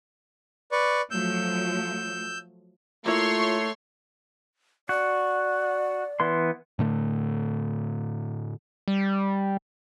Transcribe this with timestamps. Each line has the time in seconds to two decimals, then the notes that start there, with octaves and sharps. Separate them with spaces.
0.72 B4 D5 C#6
1.11 F3 F#3 A3 E6 G6
3.06 A3 A#3 E4 F4 C#5 C6
4.89 F#4 D5
6.20 E3 B3 C6
6.79 A2 D3 A3
8.88 G3